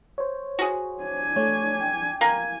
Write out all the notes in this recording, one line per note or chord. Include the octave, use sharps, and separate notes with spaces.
C5 C#5
F#4 G#4
D4 G#5
A3 C#5
G5
A#3 G#5